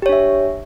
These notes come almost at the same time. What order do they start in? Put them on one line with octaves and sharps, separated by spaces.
G4 C#5 D4 E5